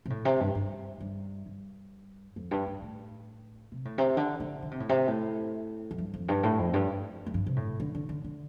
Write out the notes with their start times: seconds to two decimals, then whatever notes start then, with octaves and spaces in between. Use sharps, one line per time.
0.06 C3
0.10 A2
0.25 C3
0.40 G2
0.55 G2
1.00 G2
1.46 G2
2.36 F2
2.51 G2
2.66 G2
2.82 A2
3.72 C3
3.85 A2
3.98 C3
4.17 D3
4.40 D3
4.62 D3
4.71 C3
4.80 A2
4.89 C3
5.08 A2
5.91 F2
5.98 G2
6.14 F2
6.28 G2
6.43 A2
6.59 F2
6.74 G2
7.26 F2
7.34 G2
7.46 C3
7.56 A2
7.80 D3
7.95 D3
8.09 D3
8.24 D3